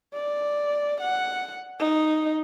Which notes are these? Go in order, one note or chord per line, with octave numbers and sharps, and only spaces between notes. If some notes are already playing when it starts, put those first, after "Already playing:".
D5
F#5
D#4